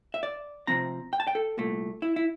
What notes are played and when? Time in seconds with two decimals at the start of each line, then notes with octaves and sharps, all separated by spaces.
0.14 E5
0.23 D5
0.67 C3 F3 C4 A#5
1.13 G5
1.20 A5
1.27 G5
1.35 A4
1.57 C2 A#2 A3
2.02 E4
2.16 E4